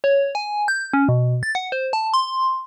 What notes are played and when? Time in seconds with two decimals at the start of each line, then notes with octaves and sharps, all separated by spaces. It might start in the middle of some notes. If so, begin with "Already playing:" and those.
0.04 C#5
0.35 G#5
0.68 G6
0.94 C#4
1.09 B2
1.43 A6
1.55 F#5
1.72 C5
1.93 A5
2.14 C6